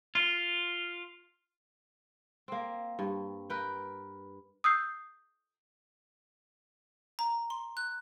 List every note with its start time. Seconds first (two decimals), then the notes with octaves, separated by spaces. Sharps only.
0.15 F4
2.48 A#3 C4
2.99 G2
3.50 A#4 B4 G5
4.64 D#6 E6 G6 C7
7.19 A#5
7.50 C6
7.77 F#6